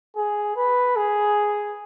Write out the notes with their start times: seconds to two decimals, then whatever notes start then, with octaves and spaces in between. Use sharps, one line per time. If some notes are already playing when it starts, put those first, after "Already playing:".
0.16 G#4
0.56 B4
0.96 G#4